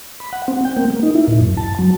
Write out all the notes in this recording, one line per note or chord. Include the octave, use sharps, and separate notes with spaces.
B5
F#5
C4
G5
A#3
A#3
D#4
E4
A#2
F#2
A5
F#3